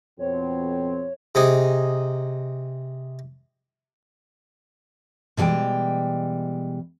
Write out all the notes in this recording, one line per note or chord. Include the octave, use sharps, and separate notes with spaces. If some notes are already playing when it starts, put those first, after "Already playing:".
F2 B2 C4 C#5
C3 D#4 G#4
B2 E3 G3 G#3 G5